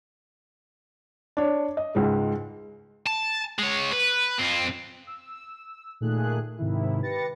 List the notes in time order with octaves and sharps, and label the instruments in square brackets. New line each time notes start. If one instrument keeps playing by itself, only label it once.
[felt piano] D4 C#5
D#5
C#2 G#2 G#3
[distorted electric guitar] A5
G#3 C#5
B4
F2 C4
[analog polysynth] E6
A#2 D#3 A3 G#4 F#6
G#2 C3 D#3 E4
G4 B4 A6 A#6 C#7